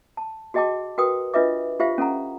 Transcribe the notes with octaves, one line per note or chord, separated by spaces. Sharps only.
A5
F#4 G#4 D#5 G5 A5 D6
F#4 A#4 B4 G5 D#6
D4 F4 B4 D#5 E5 D6
F4 G4 C5 E5 F5
C#4 A4 F#5 A#5